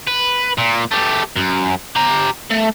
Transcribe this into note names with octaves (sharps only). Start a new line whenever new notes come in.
B4
A#2
A3 G4
F#2
G4 A#5
A3